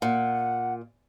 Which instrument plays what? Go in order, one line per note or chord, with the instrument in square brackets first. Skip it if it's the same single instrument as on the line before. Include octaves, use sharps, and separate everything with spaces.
[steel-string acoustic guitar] A#2 [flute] F#5